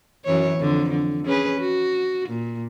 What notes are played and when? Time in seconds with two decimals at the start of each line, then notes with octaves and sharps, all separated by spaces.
0.25 F#2 E3 C#5
0.58 F2 D3
0.90 D3
1.25 C#4 G#4 B4
1.60 F#4
2.29 A#2